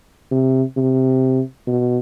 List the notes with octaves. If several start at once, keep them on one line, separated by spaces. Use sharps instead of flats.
C3
C3
B2